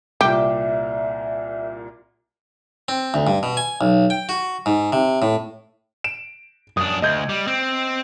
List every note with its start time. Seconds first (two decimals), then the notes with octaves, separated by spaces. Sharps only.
0.21 C2 A#2 G4 D5 E5
2.88 C4
3.14 D2
3.27 G2
3.43 B2
3.57 G#5
3.81 B1
4.10 G5
4.29 F#4
4.66 G#2
4.93 C3
5.22 A2
6.04 D7 E7
6.77 F#2 D4 D#6
7.02 D2 D#5 G6 G#6
7.29 G3
7.47 C4